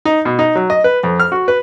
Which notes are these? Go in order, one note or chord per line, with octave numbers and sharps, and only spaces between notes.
D#4
B2
D#4
F#3
D#5
B4
F2
F6
F#4
B4